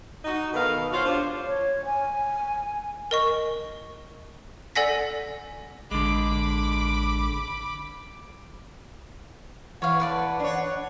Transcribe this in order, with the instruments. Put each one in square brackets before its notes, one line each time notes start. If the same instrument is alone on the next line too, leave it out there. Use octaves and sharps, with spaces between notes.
[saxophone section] D#4 F#4
B2 D#3 B3 A4 F5
F4 F#4 C5 C#5 F5
D4 F4 G4 C5 C#5
[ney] C#5
G#5
[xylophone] A#4 D#5 C#6
A4 D5 F#5 G#5 A#6 B6
[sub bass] A1 [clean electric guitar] D3 G#3 [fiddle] B5 D6
[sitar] E3 [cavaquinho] C#5 F5 [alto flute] F#5
[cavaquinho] B4 D5 A5
[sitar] D4 C#5